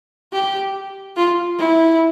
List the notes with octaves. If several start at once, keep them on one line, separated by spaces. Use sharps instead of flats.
G4
F4
E4